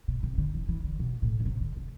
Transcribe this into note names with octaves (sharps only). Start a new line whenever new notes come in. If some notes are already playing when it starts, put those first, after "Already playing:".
B2
C3
D3
E3
E3
D3
B2
A2
D3
C3
D3
D3